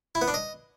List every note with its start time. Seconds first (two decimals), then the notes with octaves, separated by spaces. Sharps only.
0.15 E4
0.21 B3
0.28 D4
0.34 D#5